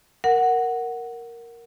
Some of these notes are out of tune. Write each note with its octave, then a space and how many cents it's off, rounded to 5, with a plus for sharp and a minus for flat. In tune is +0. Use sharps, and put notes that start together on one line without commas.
A#4 +0 F#5 +0